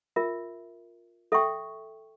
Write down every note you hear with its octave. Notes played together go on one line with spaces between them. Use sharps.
F4 A#4 E5
A4 E5 G5 C#6